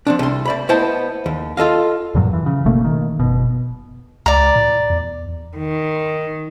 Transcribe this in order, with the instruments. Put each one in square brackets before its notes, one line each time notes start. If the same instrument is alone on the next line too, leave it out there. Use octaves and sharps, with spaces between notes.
[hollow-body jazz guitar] F3 C4 D4
C2 C6
A3 D5 B5
A3 B3 E4 C5 D#5 A5
D#2
F4 A4 D#5 F5
[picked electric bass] E2 G2 A#2 F#3
E3
C#3
G1 B2 A3 A#3
D#3
F#1 B2
[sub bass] C#2 [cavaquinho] D5 A#5
[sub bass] A2
E2
[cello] D#3